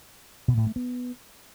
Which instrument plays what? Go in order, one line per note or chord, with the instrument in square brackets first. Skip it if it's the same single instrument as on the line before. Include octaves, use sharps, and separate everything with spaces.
[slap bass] B2
A2
A3
B3